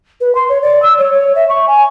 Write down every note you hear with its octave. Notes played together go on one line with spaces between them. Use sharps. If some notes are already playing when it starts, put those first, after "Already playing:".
B4
C6
C#5
D5
E6
C#5
C#5
E5
C#6
G#5